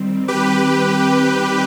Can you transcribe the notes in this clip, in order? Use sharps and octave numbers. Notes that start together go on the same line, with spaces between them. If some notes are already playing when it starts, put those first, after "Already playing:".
Already playing: D#3 G3 C4
G4 B4